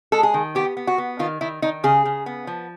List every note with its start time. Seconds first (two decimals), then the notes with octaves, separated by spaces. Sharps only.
0.12 G#3 A4
0.23 G#4
0.34 D#3
0.55 B3 G4
0.77 B3
0.87 F#4
0.98 B3
1.19 D#3 F4
1.41 D#3 E4
1.62 D#3 D#4
1.84 C#3 G#4
2.05 C#3
2.26 B3
2.47 F3